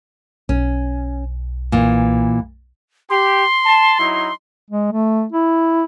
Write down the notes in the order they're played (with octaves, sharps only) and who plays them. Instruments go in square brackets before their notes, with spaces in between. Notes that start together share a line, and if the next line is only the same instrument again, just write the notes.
[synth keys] B1 [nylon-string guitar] C#4
[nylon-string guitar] A#2 E3
[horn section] G4 [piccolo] C6
[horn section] A5
F#3 D#4 E4
[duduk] G#3
A3
E4